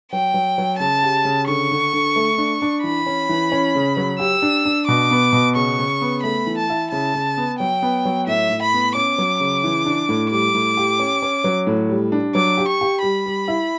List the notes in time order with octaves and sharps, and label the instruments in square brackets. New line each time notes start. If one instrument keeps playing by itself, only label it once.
[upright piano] F#3 [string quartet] G5
[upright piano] F#3
F#3
[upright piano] C#3 [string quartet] A5
[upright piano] G4
C#3
[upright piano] D3 [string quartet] C#6
[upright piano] D3
D3
A3
D4
D4
[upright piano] E3 [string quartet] B5
[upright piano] C#4
E3
C#4
C#3
F#3
[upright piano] G4 [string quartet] E6
[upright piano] D4
D4
[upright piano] B2 [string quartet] D6
[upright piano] B3
B2
[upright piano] C#3 [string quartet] C#6
[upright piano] C#3
B3
[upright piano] A3 [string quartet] B5
[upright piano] E3
[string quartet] A5
[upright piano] E4
[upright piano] C#3 [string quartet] A5
[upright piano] C#3
B3
[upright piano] F#3 [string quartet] G5
[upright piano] B3
F#3
[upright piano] A2 [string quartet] E5
[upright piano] A2
[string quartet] B5
[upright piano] B3
[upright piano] C#4 [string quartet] D6
[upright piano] F#3
C#3
E3
D4
A2
[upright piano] G3 [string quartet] D6
[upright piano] A2
G4
C#4
C#4
F#3
A2
G3
D4
[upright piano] F#3 [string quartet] D6
[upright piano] G4
[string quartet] C#6
[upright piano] G4
[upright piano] G3 [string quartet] B5
[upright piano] G3
E4